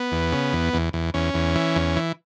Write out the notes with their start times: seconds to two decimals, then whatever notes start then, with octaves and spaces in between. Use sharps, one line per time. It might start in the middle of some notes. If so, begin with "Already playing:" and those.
Already playing: B3
0.12 E2
0.32 C#3
0.53 E2
0.74 E2
0.93 E2
1.14 E2 C#4
1.34 E2
1.55 E3
1.76 E2
1.96 E3